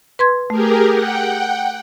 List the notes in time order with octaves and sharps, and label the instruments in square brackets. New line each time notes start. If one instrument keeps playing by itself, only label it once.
[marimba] B4 C6 G#6
[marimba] A3 [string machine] G4 G#4 A#4
[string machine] F#5 G5